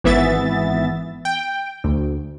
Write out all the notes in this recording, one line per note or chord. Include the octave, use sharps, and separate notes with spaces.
G#1 E3 B3 E5 A6
G5
D2